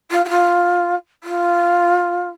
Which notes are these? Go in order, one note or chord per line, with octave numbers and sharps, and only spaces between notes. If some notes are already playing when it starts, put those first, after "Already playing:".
F4
F#4
F4
F4